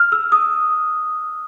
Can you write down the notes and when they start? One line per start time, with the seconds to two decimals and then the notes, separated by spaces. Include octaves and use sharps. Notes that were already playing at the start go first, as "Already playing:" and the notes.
Already playing: F6
0.12 E6
0.32 D#6